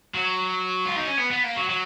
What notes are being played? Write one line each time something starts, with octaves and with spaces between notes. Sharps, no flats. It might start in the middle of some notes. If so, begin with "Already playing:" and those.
F#3
F4
D#4
C#4
B3
B3
A#3
F#3
F#3